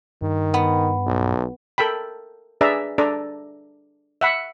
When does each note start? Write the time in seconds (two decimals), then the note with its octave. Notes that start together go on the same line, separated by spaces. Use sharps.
0.22 G2 D#3
0.54 B3
1.06 B1
1.78 A4 A#4 G5 B5
2.61 D4 G#4 B4 D5 E5 A#5
2.98 D4 A4 D5 A#5
4.21 E5 F#5 B5